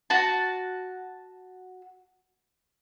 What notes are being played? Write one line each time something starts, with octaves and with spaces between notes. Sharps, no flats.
F#4 A5